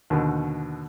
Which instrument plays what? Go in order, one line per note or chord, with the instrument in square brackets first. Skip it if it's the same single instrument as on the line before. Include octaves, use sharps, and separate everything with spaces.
[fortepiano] D#2 B2 D3